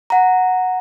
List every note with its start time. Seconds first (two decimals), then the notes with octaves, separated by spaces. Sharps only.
0.10 F#5 A#5